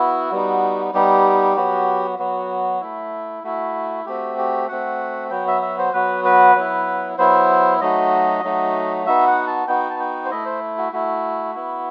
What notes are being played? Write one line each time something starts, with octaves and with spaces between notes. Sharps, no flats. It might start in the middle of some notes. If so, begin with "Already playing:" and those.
Already playing: B3 E4 F#4
G3 B3 D#4
G3 B3 D#4 G4
F#3 B3 F#4
F#3 B3 F#4
A3 E4
A3 E4 F#4
A3 C4 F#4 G4
G4
A3 C4 F#4 F#5
F#3 B3 F#4 G5
E5
E5
C5
F#3 B3 F#4 B4
B4
F#3 B3 E4
F#3 B3 E4 C5
F#3 A3 D#4 F#4 D#5
F#3 A3 D#4 F#4
B3 D#4 F#4 E5
F#5
A5
B3 D#4 F#4 G5
A5
G5
C5
A3 E4 D#5
C5
F#4
A3 E4 F#4
B3 E4